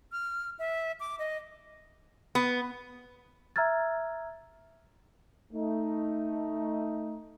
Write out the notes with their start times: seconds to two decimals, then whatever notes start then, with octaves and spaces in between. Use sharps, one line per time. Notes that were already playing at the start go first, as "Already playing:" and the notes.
0.12 F6
0.59 E5
1.00 D6
1.19 D#5
2.35 B3
3.56 E5 A#5 E6 F6 G#6 A6
5.53 A3 D#4